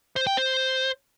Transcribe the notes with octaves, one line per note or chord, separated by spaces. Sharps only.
C5
G5
C5